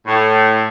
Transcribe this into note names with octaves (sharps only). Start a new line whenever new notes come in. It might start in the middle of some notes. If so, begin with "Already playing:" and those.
A2